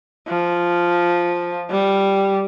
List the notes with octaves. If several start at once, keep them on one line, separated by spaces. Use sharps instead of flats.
F3
G3